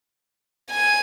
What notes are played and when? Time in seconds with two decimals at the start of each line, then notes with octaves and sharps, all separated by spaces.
0.71 G#5